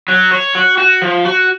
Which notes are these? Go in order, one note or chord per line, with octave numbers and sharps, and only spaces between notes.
F#3
C#5
F#4
F#4
F3
F#4